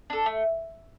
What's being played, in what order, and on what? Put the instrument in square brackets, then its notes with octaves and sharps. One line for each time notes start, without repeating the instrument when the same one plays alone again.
[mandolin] D4 A4
A3